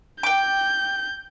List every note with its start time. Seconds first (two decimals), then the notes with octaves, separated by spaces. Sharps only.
0.23 G5 D6 G6